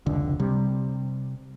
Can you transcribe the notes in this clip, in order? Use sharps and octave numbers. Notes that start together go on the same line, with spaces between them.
F1 C#2 D3
C3 G3